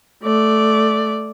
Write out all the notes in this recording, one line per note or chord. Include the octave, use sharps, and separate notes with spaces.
A3 D5